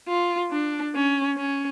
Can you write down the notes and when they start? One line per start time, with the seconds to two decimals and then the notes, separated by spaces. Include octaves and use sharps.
0.08 F4
0.51 D4
0.95 C#4
1.38 C#4